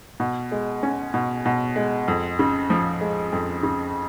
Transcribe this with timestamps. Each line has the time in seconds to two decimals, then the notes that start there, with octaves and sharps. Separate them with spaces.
0.20 B2
0.52 G#3
0.83 C#4
1.14 B2
1.45 B2
1.76 G#3
2.08 F2
2.39 C#3
2.70 F3
3.01 G#3
3.32 F2
3.63 C#3